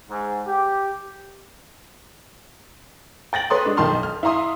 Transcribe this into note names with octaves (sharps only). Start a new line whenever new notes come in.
G#2
G4
G5 A6 A#6 F#7
A4 B4 C#5 C6 D#6
G#3 D4
B1 D#3 A5 C6 F6
F6
E4 F5 A#5 C6 D#6